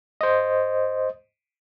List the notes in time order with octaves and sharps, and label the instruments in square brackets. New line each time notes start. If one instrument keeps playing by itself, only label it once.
[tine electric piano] C5 D#5